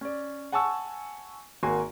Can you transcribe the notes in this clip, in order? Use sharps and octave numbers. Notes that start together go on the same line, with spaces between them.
C#4 D5
F#5 G#5 A5 C#6 E6
G#1 A#3 F#4 G#5 C6